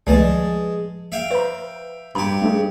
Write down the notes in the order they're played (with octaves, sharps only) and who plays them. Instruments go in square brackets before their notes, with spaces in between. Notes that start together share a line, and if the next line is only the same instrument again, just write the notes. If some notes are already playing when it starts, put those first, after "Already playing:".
[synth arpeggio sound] C#2 D#3 A3 [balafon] F3 B4 D5 [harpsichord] G#3 A5
[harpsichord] E5 F5 G5
[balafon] B4 [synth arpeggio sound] C5 A#5
[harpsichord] G2 G4 [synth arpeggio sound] A#5
[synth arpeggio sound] A3 D4 G#4